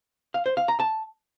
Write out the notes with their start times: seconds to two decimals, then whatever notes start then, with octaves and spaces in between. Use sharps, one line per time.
0.34 F5
0.46 C5
0.57 F5
0.68 A#5
0.80 A5